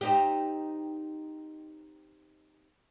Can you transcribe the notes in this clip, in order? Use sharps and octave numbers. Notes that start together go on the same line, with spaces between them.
C4 D#4 G4